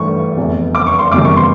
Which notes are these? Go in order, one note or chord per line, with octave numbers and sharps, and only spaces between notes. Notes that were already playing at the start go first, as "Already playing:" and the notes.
Already playing: G2 E3 A3 C#6
F1 E2 C3
D6
C#6
C6
F#1 E2 C3 D#3 G3 D6
C#6
C6